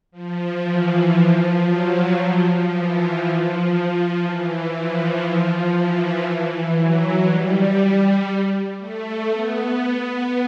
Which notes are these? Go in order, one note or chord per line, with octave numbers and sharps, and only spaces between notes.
F3
E3
F3
F#3
F3
E3
F3
F3
E3
F3
E3
F#3
G3
A3
B3